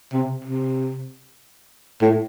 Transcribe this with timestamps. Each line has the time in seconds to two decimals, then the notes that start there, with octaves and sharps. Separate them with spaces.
0.13 C3
0.45 C3
2.02 A2